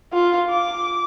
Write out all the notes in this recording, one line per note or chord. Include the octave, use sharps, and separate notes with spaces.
F4
D6